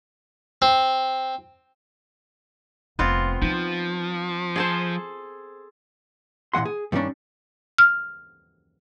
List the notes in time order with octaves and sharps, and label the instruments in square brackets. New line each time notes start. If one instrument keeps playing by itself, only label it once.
[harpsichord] C4
[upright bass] F1 [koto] B3 C4 F4
[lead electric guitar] F3 [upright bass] D#4
[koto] G#4 A4 C5
[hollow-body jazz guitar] A#2 E3 G#3 F#5 C6
G#4
G2 D#3 G3 A#3 C#4 D4
[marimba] F6